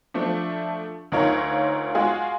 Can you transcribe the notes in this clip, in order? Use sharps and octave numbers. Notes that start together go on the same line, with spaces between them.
F3 A3 D4
D2 D#4 F4 A#4 C#5
G#3 F4 F#4 G#4